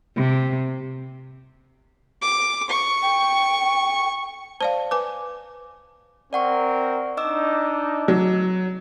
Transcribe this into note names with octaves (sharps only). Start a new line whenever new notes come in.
C3
D6
C#6
G5
C5 D5 F5 A5
B4 G#5 D6
C4 A#4 D5 F#5 C#6
D4 D#4 D#5 D6 E6
F#3